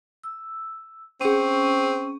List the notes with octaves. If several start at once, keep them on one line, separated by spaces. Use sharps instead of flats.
E6
C4 C#4 G#4 C#6 D#7